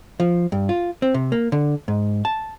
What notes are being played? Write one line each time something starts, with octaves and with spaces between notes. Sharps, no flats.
F3
G2
F4
C4
C3
A#3
D3
G#2
A5